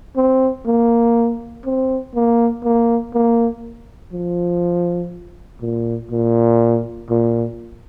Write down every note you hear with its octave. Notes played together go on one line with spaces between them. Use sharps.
C4
A#3
C4
A#3
A#3
A#3
F3
A#2
A#2
A#2